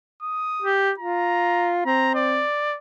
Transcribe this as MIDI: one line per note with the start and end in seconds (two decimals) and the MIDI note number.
0.23 0.72 87
0.62 0.92 67
0.99 1.82 65
0.99 1.73 82
1.86 2.43 60
1.86 2.14 82
2.15 2.77 74